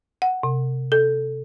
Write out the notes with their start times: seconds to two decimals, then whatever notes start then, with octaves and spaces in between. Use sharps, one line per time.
0.22 F#5
0.43 C3
0.92 A4